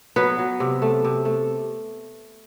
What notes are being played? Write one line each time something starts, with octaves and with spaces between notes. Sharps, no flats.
F#3 B3 B4
F#3
C3
A3
C3
A3